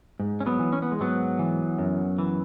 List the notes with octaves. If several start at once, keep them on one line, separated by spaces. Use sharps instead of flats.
G#2
C#4
F#3 B3
E3
C#4
B3
G#3
G#2 F#3 B3
E3
F#2
E3